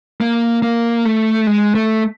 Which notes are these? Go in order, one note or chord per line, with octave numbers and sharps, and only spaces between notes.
A#3
A#3
A3
G#3
A3